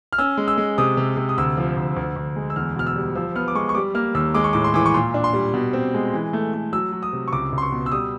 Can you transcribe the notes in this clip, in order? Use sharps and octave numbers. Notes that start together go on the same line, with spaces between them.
F6
C#4 E6
G#3
E6
G#3
C3 D#6
C3
C3
D#6
D2 E6
F3
D2
D2
D2
G#3
E6
E2 F6
B2 F6
E6
G3
F3 E6
B3 F6
D6
G#3 C#6
C#6
G3 D6
A#3 F6
D#2 E6
G#3 D6
C#6
A2 D6
C6
E3 D6
C#6
A#2 C6
D4
C6
G3
B2
C4
G#3
E3
A3
A3
F#3 E6
F#3
D#6
C3
C#6
C#2 D6
C#2
C6
C#6
B2
E6
G3 D#6